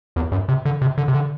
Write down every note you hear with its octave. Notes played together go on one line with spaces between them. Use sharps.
E2
F#2
C3
D3
C3
D3
C3
D3